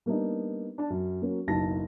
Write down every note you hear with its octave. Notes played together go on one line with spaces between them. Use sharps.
G3 A#3 B3 D4 D#4
D4 A5
F#2
F#3 A#3 C#4
F#1 B1 A5 A#6